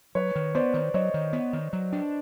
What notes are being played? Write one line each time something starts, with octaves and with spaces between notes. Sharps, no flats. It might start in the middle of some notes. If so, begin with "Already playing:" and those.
F#3 B4 C#5
D#3
B3 C5 D5
D#3
F#3 C#5 D#5
D#3
B3
D#3
F#3
D4